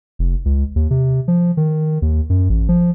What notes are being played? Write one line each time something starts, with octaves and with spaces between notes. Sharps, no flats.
F1
C#2
D#2
C3
F3
D#3
D#2
F#2
A1
F3